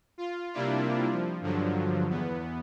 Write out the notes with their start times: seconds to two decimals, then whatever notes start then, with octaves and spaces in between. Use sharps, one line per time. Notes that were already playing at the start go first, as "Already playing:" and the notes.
0.18 F4
0.53 C3 G3 A#3 D4 E4 F4
1.12 F3
1.41 G2 D3 F3 F#3
2.10 E2 B3